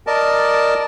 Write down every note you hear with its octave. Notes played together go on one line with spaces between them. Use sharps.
A#4 D5 D#5 A5